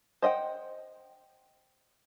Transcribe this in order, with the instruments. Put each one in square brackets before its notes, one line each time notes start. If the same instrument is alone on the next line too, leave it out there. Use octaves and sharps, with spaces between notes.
[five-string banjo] C5 D#5 F#5 G5